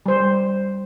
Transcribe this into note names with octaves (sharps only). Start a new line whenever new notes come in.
G3 C5